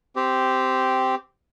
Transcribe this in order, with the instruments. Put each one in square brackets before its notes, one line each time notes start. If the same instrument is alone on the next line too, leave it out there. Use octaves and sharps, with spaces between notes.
[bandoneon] C4 G4